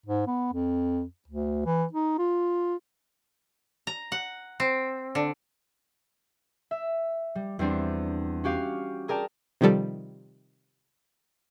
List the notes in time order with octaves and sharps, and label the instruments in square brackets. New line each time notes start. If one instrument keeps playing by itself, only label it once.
[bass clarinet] G#2
B3
F2
D2
E3
D#4
F4
[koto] A#5
F#5
C4
D3
[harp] E5
G3
E2 G3 C4 D4
C#4 F#4 G4 F5
G#4 A#4 D5 G5 A5
[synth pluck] C3 D#3 F3 G3 A4